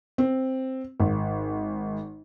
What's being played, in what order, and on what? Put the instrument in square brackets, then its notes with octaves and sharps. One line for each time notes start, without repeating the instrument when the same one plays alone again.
[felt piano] C4
G#1